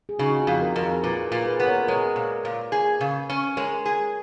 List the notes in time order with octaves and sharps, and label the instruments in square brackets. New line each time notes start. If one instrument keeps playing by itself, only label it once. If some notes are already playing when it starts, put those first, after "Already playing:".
[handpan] G#4
[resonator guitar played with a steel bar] C#3 [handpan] D#4 F#4
[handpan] F#4
F4 G#4
[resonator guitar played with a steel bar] F2
[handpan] F#4 A#4
[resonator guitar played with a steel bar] F2 [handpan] A#4
[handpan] F4 G#4
[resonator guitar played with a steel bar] A#2 [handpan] G#4 B4
[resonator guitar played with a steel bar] A#2
[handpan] G#4 B4
[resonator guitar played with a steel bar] B3
[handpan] A#4 C#5
[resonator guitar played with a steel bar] G#3 [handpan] A#4 C#5
[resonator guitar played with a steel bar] A#2
A#2
G#4
C#3
C#4
[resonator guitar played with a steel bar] G#3 [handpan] A#4 C#5
[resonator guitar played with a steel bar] G#4